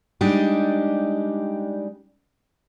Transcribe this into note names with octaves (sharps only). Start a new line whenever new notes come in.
G3 G#3 D4 D#4 G4